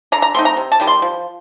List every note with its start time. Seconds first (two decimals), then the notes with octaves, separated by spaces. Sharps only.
0.12 D3 A#5
0.22 A#5
0.34 A3 C4 D#4 C6
0.45 A#5
0.57 C3
0.72 A5
0.80 D#3 G3
0.87 C6
1.02 F3